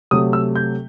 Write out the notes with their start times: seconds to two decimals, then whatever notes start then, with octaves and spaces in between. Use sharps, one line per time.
0.11 C3 F#3 A3 D#6
0.33 E6
0.56 G6